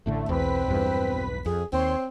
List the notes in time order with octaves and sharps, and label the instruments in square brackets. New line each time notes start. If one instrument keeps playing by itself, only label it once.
[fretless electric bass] A1 A2 D3 [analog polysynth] A3
[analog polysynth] B1 B4 B6 [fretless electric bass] E2 [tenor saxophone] C4
[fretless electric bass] E2 G2
[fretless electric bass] F2 [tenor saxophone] G#4
[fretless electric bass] D#2 [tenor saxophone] C4 [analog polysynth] C#5 C6